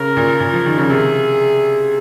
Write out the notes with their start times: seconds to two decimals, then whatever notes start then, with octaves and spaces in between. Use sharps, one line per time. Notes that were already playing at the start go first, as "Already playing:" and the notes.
Already playing: C#3 A#4
0.17 A#2
0.40 A#2
0.53 F3
0.66 D#3
0.78 C#3
0.89 C3 G#4